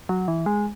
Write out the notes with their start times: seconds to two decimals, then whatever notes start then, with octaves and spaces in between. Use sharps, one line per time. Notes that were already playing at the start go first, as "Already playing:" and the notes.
0.09 F#3
0.28 E3
0.46 G#3